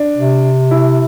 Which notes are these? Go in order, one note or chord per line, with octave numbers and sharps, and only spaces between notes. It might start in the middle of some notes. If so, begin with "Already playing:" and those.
Already playing: D4
C3
E4